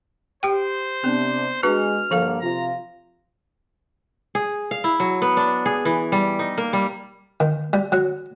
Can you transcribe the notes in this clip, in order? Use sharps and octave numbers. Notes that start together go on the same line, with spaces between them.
G4 C5 G5
C3 B3 C4 D4
G#3 D4 F#4 G#4 B4 F6
G2 D3 F3 A#3 A4 F5
C3 F4 A#5
G#4
F5
E4
F#3
B3
D4
G#4
E3
G3
D#4
A#3
G3
D#3
G3
F#3